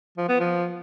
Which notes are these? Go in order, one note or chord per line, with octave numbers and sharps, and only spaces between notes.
F3
B3
F3